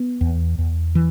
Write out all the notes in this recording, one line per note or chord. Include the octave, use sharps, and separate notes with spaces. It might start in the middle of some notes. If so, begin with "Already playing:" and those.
Already playing: B3
E2
E2
E3